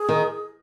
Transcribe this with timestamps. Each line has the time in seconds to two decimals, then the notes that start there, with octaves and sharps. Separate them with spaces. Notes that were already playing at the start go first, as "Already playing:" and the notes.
Already playing: G#4
0.09 D#3